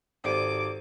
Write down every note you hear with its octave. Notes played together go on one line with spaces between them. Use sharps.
G#1 G4 A4 C5 D5 D6 D#7